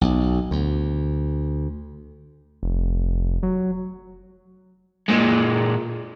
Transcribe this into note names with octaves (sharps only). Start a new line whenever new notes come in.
B1
D2
F1
F#3
A#2 G#3